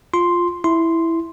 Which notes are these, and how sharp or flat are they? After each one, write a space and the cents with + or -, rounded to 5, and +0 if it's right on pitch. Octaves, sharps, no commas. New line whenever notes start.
F4 +0 C6 +0
E4 +0 C6 -5